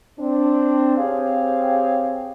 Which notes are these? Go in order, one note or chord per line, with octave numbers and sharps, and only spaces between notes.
C4 D4
C4 G4 G#4 C#5 F5